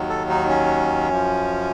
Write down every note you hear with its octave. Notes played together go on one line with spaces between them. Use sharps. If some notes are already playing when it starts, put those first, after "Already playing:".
Already playing: D#2 D#3 F#3
A4
D#4
C#4
F#2 F3